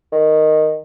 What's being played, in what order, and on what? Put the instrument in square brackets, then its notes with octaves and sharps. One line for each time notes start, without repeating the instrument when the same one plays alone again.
[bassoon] D#3